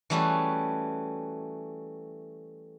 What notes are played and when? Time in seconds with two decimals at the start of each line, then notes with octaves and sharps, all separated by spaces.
0.10 E3 G3 A3 C#4 F#4 G#4